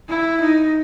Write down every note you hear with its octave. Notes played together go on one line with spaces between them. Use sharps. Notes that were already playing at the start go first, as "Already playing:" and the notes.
E4
D#4